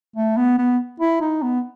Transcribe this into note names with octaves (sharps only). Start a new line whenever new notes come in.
A3
B3
B3
E4
D#4
B3